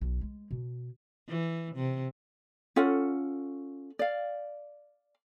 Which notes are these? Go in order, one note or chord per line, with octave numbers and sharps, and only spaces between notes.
B1
G#3
B2
E3
C3
C#4 F4 A4 F#5
D5 F5